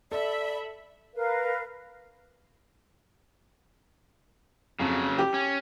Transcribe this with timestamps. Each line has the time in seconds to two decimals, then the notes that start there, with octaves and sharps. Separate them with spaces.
0.12 A4 D5 E5 B5
1.15 A#4 B4 F5
4.80 F2 C#3 F#3
5.18 G4
5.34 C#4